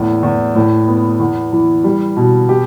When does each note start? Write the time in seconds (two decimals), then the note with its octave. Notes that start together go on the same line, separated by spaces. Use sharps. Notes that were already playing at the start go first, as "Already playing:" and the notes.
Already playing: E2 A2
0.23 E2
0.55 A2
0.88 B3
1.19 E2
1.53 E3
1.84 G3
2.17 B2
2.49 G4